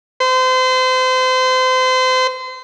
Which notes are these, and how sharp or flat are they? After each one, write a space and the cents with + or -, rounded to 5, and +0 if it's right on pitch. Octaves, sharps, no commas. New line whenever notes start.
C5 -30